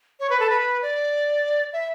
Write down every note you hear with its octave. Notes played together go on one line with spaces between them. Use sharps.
C#5
B4
A4
B4
D5
E5